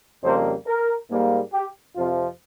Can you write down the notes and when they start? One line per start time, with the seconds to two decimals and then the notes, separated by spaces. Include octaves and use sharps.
0.23 F2 C#3 G3 A#3 C5
0.67 A#4
1.09 G#2 G3 A#3
1.53 G4
1.96 F2 C3 F3 F4